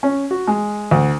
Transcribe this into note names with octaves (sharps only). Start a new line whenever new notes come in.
C#4
F#4
G#3
D2